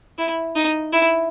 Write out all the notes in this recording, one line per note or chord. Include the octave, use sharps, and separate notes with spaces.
E4
D#4
E4